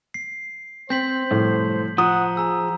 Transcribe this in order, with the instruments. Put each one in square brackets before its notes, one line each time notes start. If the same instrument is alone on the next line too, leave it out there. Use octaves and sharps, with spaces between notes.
[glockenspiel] C7
[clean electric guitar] C4 [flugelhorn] C5 [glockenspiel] G6 B6 F#7
[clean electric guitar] C2 F2 [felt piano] A2
[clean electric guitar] F3 [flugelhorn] F#5 [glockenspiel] A#5 [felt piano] D#6
[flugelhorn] G#4 [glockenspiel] A#5 E6